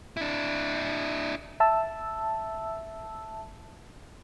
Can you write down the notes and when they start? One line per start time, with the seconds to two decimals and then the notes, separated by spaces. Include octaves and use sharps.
0.17 D4 E4
1.60 E5 A5 E6